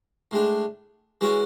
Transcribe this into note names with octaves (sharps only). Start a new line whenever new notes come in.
A2 G#3 D4
E3 G#3 C#4 F#4